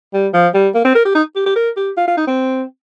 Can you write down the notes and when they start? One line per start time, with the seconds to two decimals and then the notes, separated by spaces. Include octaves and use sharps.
0.14 G3
0.34 F3
0.54 G3
0.75 A#3
0.85 C4
0.95 A#4
1.05 G4
1.15 D#4
1.36 G4
1.46 G4
1.56 A#4
1.77 G4
1.97 F4
2.08 F4
2.17 D#4
2.27 C4